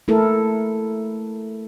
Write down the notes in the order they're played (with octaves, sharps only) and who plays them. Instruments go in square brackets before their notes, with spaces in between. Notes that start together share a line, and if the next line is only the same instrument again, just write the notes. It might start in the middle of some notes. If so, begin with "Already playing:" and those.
[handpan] A3 E4 A4 A#4